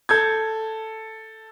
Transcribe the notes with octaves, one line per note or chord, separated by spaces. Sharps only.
A4 G6 G#6